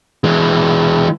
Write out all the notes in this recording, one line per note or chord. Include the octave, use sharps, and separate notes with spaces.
E3 G#3